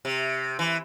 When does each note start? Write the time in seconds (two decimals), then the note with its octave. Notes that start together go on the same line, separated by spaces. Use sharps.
0.05 C3
0.59 E3